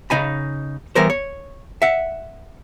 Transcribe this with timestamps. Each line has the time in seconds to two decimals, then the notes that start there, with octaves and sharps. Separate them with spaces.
0.10 C#3 D#4 G#5 B5
0.95 E3 G3 B3 A#4 C5
1.10 C#5
1.82 E5 F#5